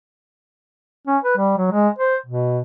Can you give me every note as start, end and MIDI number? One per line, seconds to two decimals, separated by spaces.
1.07 1.18 61
1.23 1.37 71
1.37 1.53 55
1.57 1.69 54
1.72 1.89 56
1.98 2.16 72
2.26 2.60 47